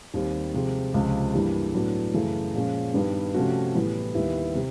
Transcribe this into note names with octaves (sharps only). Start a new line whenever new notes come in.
D#2 D#3 G3 C4
C3 F3 G#3 C4
C#2 C3 F3
G2 E3 G3 A#3
A2 F#3 B3 D4 F#4
F#2 C#3 E3 A3
A#2 F3 G#3 C#4
G2 D#3 G3 B3
C3 F3 A3 C#4 F#4
A2 E3 G3 B3
D#2 D#3 G3 B3 E4
C3